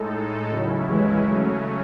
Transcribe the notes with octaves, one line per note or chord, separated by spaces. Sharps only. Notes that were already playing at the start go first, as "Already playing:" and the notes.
Already playing: A2 G#3 D#4 A4
D#2 C#3 F#3 C#4 E4
E3 G#3
C#3 F#3 A3 C#4